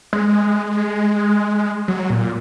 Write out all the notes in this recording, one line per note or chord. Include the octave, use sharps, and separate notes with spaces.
G#3
F#3
A#2